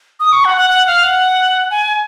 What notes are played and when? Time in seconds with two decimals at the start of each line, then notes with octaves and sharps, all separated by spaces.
0.20 D#6
0.32 C#6
0.45 F#5
0.57 F#5
0.70 F#5
0.87 F5
1.04 F#5
1.71 G#5